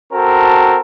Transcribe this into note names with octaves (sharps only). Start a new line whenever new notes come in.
C4 F#4 A4 A#4 A5